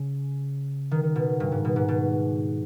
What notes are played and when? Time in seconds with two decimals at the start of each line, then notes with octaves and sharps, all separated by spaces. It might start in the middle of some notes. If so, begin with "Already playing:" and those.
Already playing: C#3
0.91 D#3
1.03 D#3
1.16 B2
1.40 G2
1.52 G#2
1.65 B2
1.76 G#2
1.88 B2